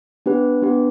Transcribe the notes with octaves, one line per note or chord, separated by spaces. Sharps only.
B3 D4 G4 B4
B3 D4 G4 B4